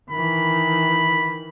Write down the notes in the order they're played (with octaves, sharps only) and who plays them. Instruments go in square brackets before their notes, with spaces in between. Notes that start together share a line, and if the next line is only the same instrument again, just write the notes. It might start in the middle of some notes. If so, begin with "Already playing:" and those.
[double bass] D#3 E3 [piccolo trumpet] B5